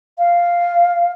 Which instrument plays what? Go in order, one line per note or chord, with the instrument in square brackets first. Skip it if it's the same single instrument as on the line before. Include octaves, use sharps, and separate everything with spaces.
[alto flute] F5